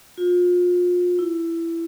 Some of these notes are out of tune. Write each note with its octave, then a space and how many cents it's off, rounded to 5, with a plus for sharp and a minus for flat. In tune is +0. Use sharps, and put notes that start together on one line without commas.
F4 +30
E4 +15